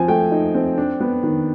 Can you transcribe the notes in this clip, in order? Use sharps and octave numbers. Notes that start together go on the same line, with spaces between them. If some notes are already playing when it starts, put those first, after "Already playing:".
Already playing: F3 C4 G#5
A3 G5
D#4
C4
D4
B3
D#3